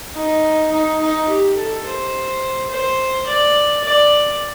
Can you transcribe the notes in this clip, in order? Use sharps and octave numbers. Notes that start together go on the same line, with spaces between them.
D#4
D#4
D#4
G4
A4
C5
C5
D5
D5